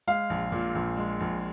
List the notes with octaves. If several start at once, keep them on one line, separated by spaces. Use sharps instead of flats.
G#3 F5
A#1
A#2
A#1
G#3
A#1